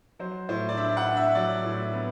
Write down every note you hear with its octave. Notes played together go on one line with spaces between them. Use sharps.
F#3 C5
A2 C5
D5
D4 E5
F#5
D4
E5
F#3 D5
A2
B3